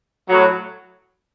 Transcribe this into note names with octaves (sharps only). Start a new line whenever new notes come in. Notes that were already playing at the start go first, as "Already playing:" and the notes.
A2 F#3